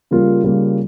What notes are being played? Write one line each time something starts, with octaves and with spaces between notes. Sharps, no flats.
C#3 G3 A#3 F4
C#3 G3 A#3 F4